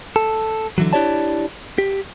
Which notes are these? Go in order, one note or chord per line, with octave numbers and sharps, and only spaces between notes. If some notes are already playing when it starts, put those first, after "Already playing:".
A4
D3 E3 F#3
D4 E4 G4 C#5 D5 A5
G4